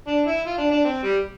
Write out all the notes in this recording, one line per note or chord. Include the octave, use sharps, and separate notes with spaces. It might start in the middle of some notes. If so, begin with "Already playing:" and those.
D4
E4
F4
D4
D4
C4
G3